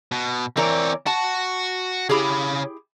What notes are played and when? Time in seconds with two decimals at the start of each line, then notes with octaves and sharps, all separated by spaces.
0.12 B2
0.57 E3 C4 A#4 C#5 D5
1.06 F#4 A5
2.09 C#3 E4 G4 G#4 B5